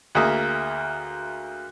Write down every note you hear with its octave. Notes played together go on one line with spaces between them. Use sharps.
D2 A#3 G#4 E5 D#6